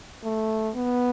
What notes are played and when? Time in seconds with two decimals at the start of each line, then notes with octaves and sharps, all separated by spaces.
0.24 A3
0.75 B3